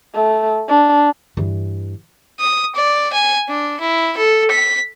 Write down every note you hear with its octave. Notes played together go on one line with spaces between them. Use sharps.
A3
D4
G2 E3
D#6
D5
G#5
D4
E4
A4
B6